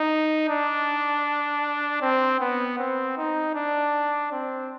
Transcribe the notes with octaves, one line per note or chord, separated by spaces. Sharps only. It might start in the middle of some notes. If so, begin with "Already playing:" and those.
Already playing: D#4
D4
C4
B3
C4
D#4
D4
C4